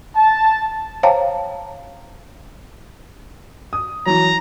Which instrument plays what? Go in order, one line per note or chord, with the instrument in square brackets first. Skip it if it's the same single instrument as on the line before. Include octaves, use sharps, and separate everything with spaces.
[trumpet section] A5
[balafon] C5 C#5 F5 G5 A5 A#5
[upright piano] D#6
[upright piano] E3 F#3 [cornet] A#5